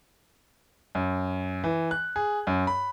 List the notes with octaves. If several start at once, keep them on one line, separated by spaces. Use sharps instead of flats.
F#2
E3
F#6
G#4
F#2
B5